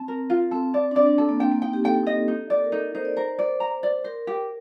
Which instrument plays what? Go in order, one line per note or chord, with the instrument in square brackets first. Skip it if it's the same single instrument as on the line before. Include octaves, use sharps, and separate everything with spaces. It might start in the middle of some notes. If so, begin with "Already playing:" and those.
Already playing: [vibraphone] C4 [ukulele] A5
[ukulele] A#4
F4
[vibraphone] C4 [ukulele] A4
[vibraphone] C4 [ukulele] D5
[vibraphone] D4
[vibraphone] C4 [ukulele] D5
[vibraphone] D4
[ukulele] A4
[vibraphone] A#3
[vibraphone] C4 [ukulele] G5
[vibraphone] A#3
[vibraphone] D#4 [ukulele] G5
[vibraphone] G4
[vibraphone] A4 [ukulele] G5
[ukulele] D#5
D#4
D5
[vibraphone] A#4
[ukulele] D#4 [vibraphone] A4
[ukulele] D#4 [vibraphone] C5
[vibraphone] D5
[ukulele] A#4 [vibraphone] C5
[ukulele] D5
A#5
D5
[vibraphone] A#4 [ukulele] C5
[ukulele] G4